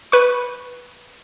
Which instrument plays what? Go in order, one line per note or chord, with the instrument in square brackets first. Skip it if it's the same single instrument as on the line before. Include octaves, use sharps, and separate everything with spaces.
[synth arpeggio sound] B4 C#6